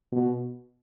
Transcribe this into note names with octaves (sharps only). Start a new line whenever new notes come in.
B2